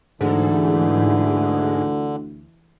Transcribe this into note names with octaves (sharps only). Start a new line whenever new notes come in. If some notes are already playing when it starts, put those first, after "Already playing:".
D2 G#2 D3 E3